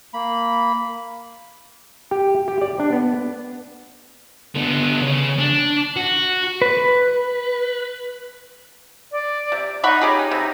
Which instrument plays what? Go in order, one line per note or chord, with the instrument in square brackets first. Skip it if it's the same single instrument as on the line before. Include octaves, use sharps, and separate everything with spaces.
[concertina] A#3 B5
[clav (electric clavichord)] G4
G4
D5
D4
B3
[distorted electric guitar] D3 B3
C#3
D4
F#4
[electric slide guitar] B4
[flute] D5
[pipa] C3
[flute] D#4 [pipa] F#5 B5 C#6
[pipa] C#4 G4 G#4 [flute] D#4
[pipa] C3